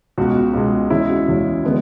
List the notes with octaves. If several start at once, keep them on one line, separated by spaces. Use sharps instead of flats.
C#2 B2 G#3 F#4
C#2 B2 G#3
E2 C#3 G#3 E4
F#4
E2 C#3 G#3
D3 G#3 B3